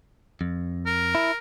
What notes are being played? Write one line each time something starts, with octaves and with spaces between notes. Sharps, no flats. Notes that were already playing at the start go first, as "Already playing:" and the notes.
F2
A#4
E4